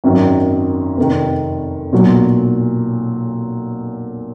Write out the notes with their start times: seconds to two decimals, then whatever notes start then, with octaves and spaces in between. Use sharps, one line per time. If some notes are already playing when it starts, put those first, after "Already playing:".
0.04 G#1 F#2 D#3 F#3
0.97 F1 F2 D#3
1.93 B1 A#2 F#3